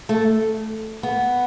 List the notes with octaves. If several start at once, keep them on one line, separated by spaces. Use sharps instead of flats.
A3
B3